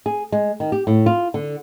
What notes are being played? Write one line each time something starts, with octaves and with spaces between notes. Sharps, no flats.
G#4
G#3
D#3
G4
A2
F4
D3